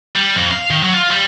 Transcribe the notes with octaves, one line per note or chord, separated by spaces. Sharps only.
G3
F2
F5
D#3
F#3
F4
G3